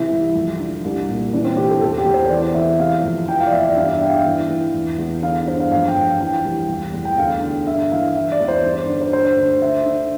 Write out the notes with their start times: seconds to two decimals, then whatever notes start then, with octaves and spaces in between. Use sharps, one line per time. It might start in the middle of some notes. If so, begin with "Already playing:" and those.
Already playing: C3 E3 E4
0.11 C2
0.35 F2
0.60 D3
0.84 C2
1.09 A#2
1.33 E3 D4
1.45 C4
1.57 C3 G4
1.69 A4
1.81 E2 A4
1.98 G4
2.05 E2
2.14 C5
2.30 E3 D5
2.54 E3 E5
2.79 C3 F5
3.03 F2
3.28 E3 G5
3.40 F5
3.47 D5
3.52 E2 E5
3.64 D5
3.76 G2 F5
3.93 E5
4.01 G2 G5
4.09 F5
4.26 E3
4.50 E3
4.74 E2
4.98 E2
5.22 D3 F5
5.47 G2 C5
5.60 F5
5.72 F2 F5
5.88 G5
5.97 F2
6.04 F5
6.20 E3 G5
6.45 C2
6.69 E2
6.93 E2
7.05 G5
7.18 D2 F5
7.42 D3
7.67 G2 E5
7.91 E3 F5
8.16 E3 E5
8.32 D5
8.40 E2
8.48 C5
8.64 G2 D5
8.89 D3
9.01 C5
9.13 D3 C5
9.37 D2
9.62 D3 E5
9.86 D3